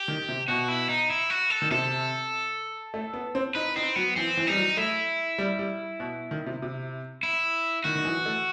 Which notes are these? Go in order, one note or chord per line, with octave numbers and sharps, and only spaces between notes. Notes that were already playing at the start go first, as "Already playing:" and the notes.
Already playing: G4
D#3
C3
B2 F#4
E4
D#4
E4
F#4
A4
D#3
C3 A4
A3
B3
C4
D#4 B4
C4 D#4
F#3 B3
E3 C4
E3
G3 D#4
F#3
A3 E4
G3
G3
B2
D#3
C3
C3
E4
D#3 F#4
D#3
E3
A3